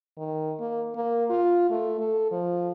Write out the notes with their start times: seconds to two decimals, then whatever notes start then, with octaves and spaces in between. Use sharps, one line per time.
0.17 D#3
0.60 A#3
0.95 A#3
1.30 F4
1.70 A3
1.99 A4
2.31 F3